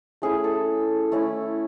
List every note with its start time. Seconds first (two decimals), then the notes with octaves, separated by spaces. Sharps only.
0.22 A3 C#4 E4 G#4
0.44 A4
1.12 A3 C#4 E4